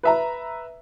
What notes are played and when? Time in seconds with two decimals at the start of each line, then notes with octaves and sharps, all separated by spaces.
0.03 B4 E5 A#5